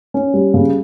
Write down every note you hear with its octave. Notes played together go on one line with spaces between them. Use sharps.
C#4
G3
C#3